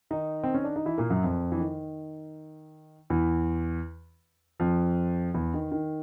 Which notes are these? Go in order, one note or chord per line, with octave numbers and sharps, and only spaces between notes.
D#3 D#4
C4
C#4
D4
D#4
E3 E4
A#2 A#3
F#2 F#3
F2 F3
E3
D#3
E2 E3
F2 F3
E2 E3
D#3
D#3